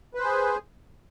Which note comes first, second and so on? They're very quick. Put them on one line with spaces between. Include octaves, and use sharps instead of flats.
B4 C5 G#4